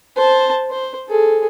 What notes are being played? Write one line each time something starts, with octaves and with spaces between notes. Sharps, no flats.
C5 A5
C5
G#4 A4